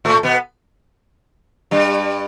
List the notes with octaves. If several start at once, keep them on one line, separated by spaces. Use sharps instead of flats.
A2 A3
B2 B3
G2 G3